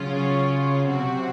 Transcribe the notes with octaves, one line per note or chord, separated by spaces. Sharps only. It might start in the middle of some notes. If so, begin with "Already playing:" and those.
Already playing: C#3 F#3 C#4 F4
C3 F#3 C4 F#4